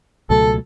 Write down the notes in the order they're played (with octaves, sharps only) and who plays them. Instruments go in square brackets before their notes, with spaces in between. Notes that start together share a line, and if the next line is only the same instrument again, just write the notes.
[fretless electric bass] C#2 B2 F#3 A3 [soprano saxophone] A4